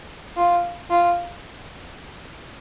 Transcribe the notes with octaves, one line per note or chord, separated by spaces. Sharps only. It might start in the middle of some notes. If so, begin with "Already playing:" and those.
F4
F4